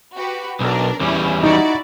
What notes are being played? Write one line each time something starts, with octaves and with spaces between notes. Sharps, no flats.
F#4 G4 B4
B1 D4 A#4
E2 G3 C#4 E4
D#4 E4 F#4 D5